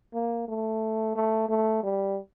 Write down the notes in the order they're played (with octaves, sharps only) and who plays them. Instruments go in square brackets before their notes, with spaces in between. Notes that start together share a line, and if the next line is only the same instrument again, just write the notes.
[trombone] A#3
A3
A3
A3
G3